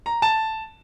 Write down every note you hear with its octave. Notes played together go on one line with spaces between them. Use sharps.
A#5
A5